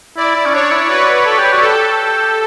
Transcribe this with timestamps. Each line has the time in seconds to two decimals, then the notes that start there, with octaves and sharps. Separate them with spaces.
0.17 E4 D5
0.36 E4
0.46 C#4
0.54 D4 C#5
0.71 E4
0.89 F#4 B4
1.26 A4
1.38 G4
1.52 F#4
1.61 A4
1.66 G4